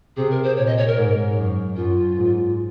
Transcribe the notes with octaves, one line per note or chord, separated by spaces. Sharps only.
C3 G#4
A#4
C5
A#2 C#5
D#5
C#5
A#4
G#2
F#2
F#2 F4
G#2